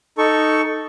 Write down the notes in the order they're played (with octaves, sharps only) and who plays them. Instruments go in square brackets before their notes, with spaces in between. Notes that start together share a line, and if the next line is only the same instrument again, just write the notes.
[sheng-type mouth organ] D#4 A4 C#6